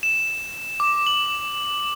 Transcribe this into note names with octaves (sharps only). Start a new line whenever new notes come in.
E7
D6
F#7